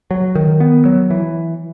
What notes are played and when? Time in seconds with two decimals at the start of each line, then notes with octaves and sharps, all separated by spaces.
0.11 F#3
0.35 D#3
0.60 B3
0.85 F#3
1.10 E3